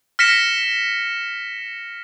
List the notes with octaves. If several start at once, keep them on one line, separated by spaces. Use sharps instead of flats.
F6 A#6 B6 C#7 E7